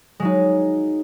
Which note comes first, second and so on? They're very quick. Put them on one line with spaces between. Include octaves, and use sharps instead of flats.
G#3 F#3 D#4